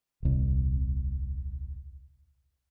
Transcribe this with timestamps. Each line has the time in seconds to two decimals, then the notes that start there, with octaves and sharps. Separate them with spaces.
0.23 D#1 C2